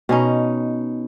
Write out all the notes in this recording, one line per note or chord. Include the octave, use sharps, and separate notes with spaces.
B2 C#4 D#4